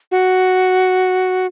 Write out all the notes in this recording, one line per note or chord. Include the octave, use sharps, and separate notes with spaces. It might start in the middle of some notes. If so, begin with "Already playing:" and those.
F#4